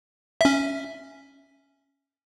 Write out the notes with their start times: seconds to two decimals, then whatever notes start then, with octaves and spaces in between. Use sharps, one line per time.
0.41 C#4 E5